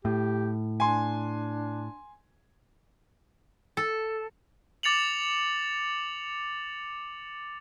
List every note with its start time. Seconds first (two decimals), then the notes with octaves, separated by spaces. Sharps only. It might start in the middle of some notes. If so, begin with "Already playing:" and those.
0.05 A2 G4
0.80 D4 G#5 C6
3.77 A4
4.83 D6 A6 C#7 F7 F#7